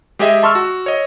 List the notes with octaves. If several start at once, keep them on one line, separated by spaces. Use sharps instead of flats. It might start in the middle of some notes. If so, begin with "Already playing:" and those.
G#3 G4 G#4 D#5 E5
A5 C6 C#6 E6 F6
F#4
C#5 D#5